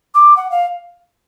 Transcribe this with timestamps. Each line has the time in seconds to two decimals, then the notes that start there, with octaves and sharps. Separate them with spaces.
0.15 D6
0.37 F#5
0.51 F5